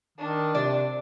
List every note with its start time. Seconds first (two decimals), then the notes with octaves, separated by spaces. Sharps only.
0.18 D#3 D4
0.55 C3 D5